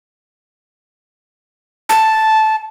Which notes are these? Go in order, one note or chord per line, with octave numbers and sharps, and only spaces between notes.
A5